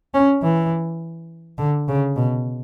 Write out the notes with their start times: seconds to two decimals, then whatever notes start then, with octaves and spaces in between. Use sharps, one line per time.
0.14 C#4
0.43 E3
1.58 D3
1.88 C#3
2.16 B2